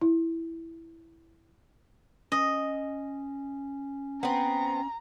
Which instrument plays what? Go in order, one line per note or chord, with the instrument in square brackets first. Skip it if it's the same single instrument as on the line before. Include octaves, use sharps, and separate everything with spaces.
[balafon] E4
[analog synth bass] C#4 [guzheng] D#5
[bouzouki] B3 C4 [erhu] A#5